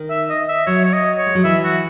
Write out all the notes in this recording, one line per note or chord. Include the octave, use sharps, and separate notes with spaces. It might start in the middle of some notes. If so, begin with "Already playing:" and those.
Already playing: D#3
E5
D#5
E5
F#3 C#5
C#5
D#5
C#5
G#3
F#3
E3 E5
F#4